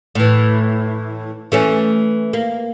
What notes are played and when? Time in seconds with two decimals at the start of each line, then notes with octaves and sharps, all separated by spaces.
0.15 A2 E3
1.52 E3 A3 C#4
2.33 A#3